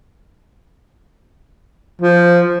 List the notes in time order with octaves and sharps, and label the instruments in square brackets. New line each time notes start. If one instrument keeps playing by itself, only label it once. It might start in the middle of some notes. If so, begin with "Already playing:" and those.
[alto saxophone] F3